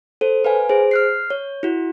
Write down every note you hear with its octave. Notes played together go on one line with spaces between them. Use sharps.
A4 C5
B4 F5 G#5
G#4 C5
F6 F#6 C7
C#5
E4 F#4